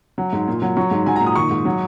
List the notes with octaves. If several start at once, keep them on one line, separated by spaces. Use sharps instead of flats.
F#3
G#2
A#2
F#3
F#3 C#6
G#2
F#3 G#5
A#5
A#2
D#6
D#3 C#6
G#2
F#3